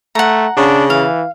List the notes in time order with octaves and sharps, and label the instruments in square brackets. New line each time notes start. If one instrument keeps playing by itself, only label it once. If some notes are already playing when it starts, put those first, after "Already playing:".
[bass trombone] A3 [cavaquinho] F#5 A#5
[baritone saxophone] C#3 [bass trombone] D4
[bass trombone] E3 [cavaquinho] F5